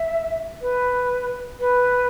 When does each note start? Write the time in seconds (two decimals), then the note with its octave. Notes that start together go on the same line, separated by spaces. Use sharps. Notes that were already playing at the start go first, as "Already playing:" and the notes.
Already playing: E5
0.62 B4
1.60 B4